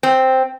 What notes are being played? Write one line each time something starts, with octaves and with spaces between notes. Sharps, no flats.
C4